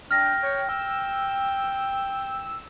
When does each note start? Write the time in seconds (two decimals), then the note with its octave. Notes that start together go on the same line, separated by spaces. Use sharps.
0.11 D4 G5 F6 A#6
0.43 C#5
0.69 G5 E6